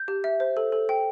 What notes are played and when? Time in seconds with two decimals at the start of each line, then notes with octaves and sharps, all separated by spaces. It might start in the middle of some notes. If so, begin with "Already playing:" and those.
Already playing: G6
0.08 G4
0.24 E5
0.40 C5
0.57 A4
0.72 A4
0.89 G5